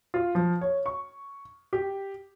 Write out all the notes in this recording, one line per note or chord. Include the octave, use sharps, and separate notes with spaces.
F4
F3
C#5
C#6
G4